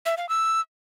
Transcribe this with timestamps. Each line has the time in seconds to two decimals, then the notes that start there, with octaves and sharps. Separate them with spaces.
0.06 E5
0.17 F5
0.29 E6